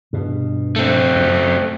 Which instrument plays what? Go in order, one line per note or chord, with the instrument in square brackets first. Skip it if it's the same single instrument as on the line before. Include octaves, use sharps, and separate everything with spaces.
[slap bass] G2 B2
[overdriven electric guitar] A3 C4
[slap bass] F#2